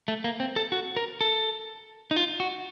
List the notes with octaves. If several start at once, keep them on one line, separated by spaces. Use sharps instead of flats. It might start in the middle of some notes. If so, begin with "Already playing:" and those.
A3
A#3
C4
A4
F#4
A#4
A4
D#4
F4
F#4